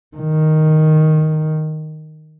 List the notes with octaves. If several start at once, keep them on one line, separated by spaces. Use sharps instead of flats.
D#3